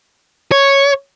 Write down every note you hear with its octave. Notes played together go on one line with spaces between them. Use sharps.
C#5